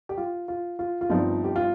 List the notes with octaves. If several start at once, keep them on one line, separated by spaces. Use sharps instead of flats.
G4
F4
F4
F4
F4
G1 G2 F3 C4 D#4
G4
F4